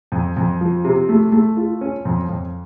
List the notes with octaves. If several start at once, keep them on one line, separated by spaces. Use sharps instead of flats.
F2
F2
F3
C3
A3
A3
F4
C#4
F2
F2